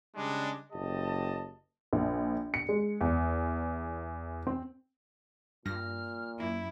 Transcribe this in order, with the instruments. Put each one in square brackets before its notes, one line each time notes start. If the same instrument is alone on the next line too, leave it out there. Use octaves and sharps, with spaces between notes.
[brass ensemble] C#3 G3 G#3 D4
F#1 G4 D#5 A5
[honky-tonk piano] A#1
C#7
G#3
E2
C4
[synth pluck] G2 A#6 [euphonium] A#2 [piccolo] F6
[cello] F#2 E4 [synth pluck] A#3